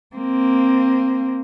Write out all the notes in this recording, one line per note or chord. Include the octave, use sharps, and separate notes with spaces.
A#3 C4